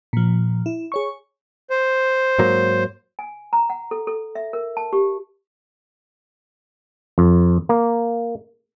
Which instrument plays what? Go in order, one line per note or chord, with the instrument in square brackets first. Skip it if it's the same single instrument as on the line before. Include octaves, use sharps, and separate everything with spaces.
[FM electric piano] A#2 F3
E4
G#4 C#5 C#6
[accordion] C5
[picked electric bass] G#2 F#3 A#3
[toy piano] G#5
A#5
F#5
A4
A4
E5
A#4
A5
G4
[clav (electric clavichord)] F2
A#3